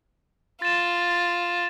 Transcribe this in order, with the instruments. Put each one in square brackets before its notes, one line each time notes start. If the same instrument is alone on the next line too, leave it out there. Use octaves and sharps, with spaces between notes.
[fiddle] F4 [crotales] A6 E7